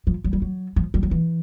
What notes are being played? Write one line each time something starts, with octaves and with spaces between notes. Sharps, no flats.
F3
F#3
G3
F#3
F3
G3
F#3
E3